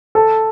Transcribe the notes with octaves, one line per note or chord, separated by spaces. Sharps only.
A4